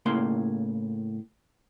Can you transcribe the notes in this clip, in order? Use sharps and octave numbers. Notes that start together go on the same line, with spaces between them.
A2 C#3 A#3 C6